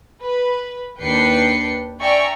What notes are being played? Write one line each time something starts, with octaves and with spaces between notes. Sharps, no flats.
B4
D#2 D4 B4 G5 C7 C#7
D5 E5 G5 G#5 A#5 C#6